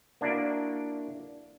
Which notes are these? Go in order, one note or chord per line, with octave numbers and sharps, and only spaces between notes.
A#3 D4 E4 F#4 D5